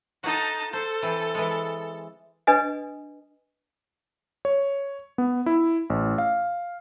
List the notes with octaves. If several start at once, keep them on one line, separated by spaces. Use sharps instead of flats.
D#4 F#4 A4 A5
A4 C5
E3 C4
E3 G#3
D4 B4 D#5 G#5 D#6
C#5
B3
E4
A1
F5